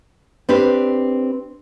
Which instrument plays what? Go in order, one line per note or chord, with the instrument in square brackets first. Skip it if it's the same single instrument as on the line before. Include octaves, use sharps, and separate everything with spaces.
[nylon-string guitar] C4 D4 G4 B4